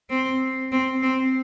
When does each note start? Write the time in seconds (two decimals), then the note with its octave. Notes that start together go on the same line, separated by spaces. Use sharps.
0.10 C4
0.72 C4
1.02 C4